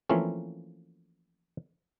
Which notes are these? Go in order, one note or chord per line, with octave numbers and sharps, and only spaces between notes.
E3 F3 A3 A#3 C4 C#4